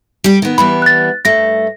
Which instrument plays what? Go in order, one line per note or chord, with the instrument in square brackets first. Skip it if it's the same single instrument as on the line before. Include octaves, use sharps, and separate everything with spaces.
[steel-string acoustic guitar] G3 G4
D#3 B3
[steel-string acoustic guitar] E3 G3 B3 [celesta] B5
[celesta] F#6 A6
[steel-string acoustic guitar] G2 A3 [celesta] A#6